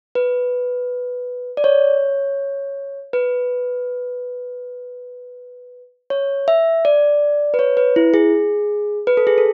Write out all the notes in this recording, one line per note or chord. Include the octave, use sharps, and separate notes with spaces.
B4
D5
C#5
B4
C#5
E5
D5
B4
C#5
B4
E4
G#4
B4
A4
G#4
A4